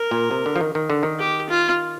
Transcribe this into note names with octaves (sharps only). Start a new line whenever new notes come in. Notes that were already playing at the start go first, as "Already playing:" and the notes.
Already playing: A#4
A#2
C3
D3
F3
D#3
D#3
D3
D#3
G4
F4